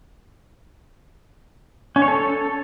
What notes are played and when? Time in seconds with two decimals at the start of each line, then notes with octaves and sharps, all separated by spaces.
1.96 C#4
2.02 C#5
2.08 A4